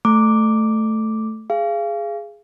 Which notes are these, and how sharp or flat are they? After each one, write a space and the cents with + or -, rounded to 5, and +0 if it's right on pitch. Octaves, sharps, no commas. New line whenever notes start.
A3 +0 D6 +0
G#4 +0 F5 -30